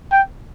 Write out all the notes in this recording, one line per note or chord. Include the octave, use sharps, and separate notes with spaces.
G5